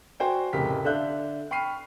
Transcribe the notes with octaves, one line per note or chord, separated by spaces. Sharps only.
F#4 C5 D5 G5 G#5
F1 A2 C#3 G4 A#4 B6
D3 D4 E5 F5 F#6 G6
G5 B5 C#6 F6 C7 D#7